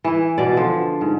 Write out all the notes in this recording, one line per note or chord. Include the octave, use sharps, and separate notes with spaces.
E3 E4
B2 D5
D3 F3
G#2